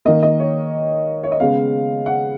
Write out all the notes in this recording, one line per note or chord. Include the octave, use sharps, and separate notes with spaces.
D#3 A#3 D#5
D#5
C#5
C#5
D#5
C#3 G#3 B3 F5
F#5